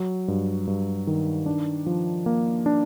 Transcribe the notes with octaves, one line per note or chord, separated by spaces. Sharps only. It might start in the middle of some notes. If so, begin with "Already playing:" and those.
Already playing: F#3
G2
G2
D#3
D4
F3
A#3
D4